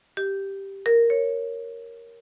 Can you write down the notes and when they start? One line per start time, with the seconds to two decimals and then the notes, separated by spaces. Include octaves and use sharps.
0.17 G4
0.86 A#4
1.10 C#5